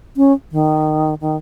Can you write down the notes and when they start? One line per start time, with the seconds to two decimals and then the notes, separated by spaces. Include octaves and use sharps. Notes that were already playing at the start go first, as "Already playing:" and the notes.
0.17 C#4
0.52 D#3
1.21 D#3